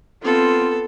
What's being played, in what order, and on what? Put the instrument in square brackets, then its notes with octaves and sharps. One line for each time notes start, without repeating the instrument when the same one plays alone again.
[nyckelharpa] B3 A4 [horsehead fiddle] C4 F4